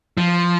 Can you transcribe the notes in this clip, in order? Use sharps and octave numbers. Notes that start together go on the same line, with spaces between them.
F3